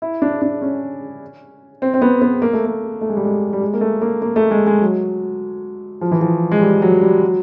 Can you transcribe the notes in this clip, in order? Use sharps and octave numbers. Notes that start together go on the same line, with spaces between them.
E4
D4
D4
C#4
C4
C4
B3
B3
A#3
A3
A#3
A3
G#3
G3
G#3
G3
G#3
A#3
A3
A#3
A#3
A3
G#3
G#3
F#3
F3
E3
F3
G#3
G3
F#3
G3
F#3